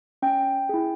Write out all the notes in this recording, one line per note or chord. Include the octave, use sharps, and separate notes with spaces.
C#4 G5
E4 G#4